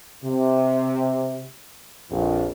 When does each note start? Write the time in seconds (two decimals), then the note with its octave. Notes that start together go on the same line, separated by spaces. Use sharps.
0.24 C3
2.11 A#1 F2